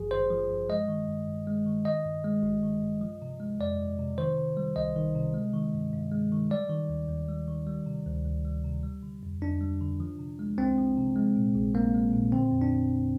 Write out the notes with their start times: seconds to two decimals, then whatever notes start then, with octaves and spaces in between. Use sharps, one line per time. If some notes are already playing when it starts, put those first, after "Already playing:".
Already playing: G#1 G2 F3 G#4
0.11 G#1 C5
0.30 F3
0.50 G2
0.69 G#3 D#5
0.88 D#3
1.08 G2
1.27 G2
1.47 G#3
1.66 D#3
1.85 D#3 D#5
2.05 G2
2.24 G#3
2.43 G#1
2.63 D#3
2.82 G2
3.01 F3
3.22 C3
3.40 G#3
3.60 F2 D5
3.79 F3
3.99 C3
4.18 D#3 C5
4.37 C3
4.57 G3
4.76 C2 D#5
4.96 D#3
5.16 C3
5.34 G#3
5.53 D#3
5.74 G2
5.93 G2
6.12 G#3
6.32 D#3
6.50 G3 D5
6.70 D#3
6.89 D#2
7.09 D#2
7.29 G3
7.48 D#3
7.67 G3
7.86 C3
8.06 D2
8.26 D2
8.45 G3
8.64 C3
8.83 G3
9.03 D3
9.23 F2
9.42 F2 D4
9.61 G3
9.81 D3
10.00 F3
10.19 C3
10.39 G#3
10.58 C2 C4
10.78 F3
10.97 C3
11.16 G#3
11.36 A#2
11.55 A#1
11.75 A#1 A#3
11.94 G#3
12.14 A#2
12.32 D3 C4
12.51 F2
12.61 D4
12.71 G1
12.90 G1